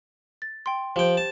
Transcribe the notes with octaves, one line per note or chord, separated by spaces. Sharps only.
A6
G5 C6
F3 G4 C5 G5
A5